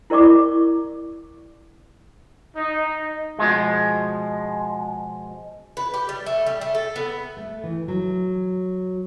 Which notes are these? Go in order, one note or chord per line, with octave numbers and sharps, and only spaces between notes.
E4 A#4 D5 C#6 D6
D#4
B2 F3 G#3
B4
G4
G3
A3
G3
A3
A4
B3
A3
E3
F#3